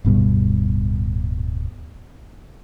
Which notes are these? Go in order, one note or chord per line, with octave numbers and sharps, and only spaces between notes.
D1 G2 B2 G3